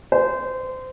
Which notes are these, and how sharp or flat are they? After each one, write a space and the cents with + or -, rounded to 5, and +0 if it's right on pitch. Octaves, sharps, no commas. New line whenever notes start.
C5 -25